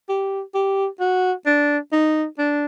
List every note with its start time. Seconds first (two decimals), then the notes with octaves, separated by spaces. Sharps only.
0.09 G4
0.54 G4
1.00 F#4
1.46 D4
1.93 D#4
2.38 D4